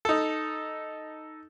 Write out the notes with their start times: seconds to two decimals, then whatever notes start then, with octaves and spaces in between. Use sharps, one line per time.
0.05 D#4 A4